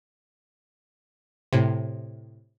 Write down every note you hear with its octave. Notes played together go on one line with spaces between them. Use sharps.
A2 C3